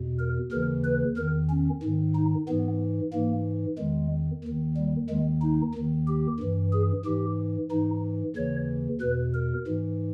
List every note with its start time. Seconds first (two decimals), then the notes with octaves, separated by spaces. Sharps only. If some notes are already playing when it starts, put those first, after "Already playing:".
Already playing: E2 B2
0.19 A#4
0.52 D#2 C#3 E3 A#4
0.85 B4
1.17 E2 D#3 A#4
1.50 C#4
1.83 G#2 D#3
2.15 D#4
2.48 G#2 E3 B3
3.13 G#2 E3 A#3
3.78 E2 D#3 G#3
4.44 D#2 D#3
4.77 G3
5.09 D#2 D#3 G#3
5.42 D#4
5.74 D#2 D#3
6.07 G4
6.40 G2 E3
6.73 G#4
7.05 G#2 E3 G4
7.71 G#2 E3 D#4
8.36 D#2 C#3 E3 C#5
9.01 E2 B2 B4
9.34 A#4
9.67 G#2 E3